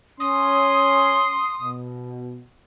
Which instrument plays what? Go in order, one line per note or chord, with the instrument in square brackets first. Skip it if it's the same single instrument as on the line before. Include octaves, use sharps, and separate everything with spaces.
[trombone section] C#4 [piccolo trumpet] C6 [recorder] D#6
[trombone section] B2